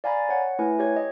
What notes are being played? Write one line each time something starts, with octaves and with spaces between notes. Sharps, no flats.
D5 F5 G#5 A#5 B5 A6
C#5 F#5
A3 E4 B4 G#5
G4 C#5 G#6
D#5